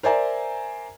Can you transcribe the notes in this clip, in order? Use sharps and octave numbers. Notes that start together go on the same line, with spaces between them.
A#4 C5 D5 E5 G#5 A#5